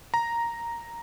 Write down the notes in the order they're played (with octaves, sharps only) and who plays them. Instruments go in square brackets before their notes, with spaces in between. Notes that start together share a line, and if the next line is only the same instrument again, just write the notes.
[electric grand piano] A#5